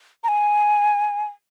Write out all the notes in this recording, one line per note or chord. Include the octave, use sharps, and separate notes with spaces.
A#5
G#5